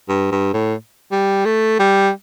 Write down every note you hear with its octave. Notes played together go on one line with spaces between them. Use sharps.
G2
G2
A2
G3
A3
G3